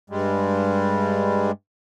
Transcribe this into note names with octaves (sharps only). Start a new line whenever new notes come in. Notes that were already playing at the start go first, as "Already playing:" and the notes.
G2 G3 G#3